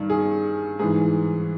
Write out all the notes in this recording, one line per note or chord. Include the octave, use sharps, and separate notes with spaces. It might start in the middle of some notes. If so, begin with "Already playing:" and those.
Already playing: G2 D#3
G#4
G#2 E3 G#4